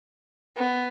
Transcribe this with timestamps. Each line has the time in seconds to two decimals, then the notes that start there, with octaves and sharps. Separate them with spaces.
0.57 B3